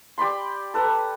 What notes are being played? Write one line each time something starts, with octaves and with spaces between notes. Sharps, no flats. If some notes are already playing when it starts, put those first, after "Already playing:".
G4 D5 B5 C6
A4 B4 A#5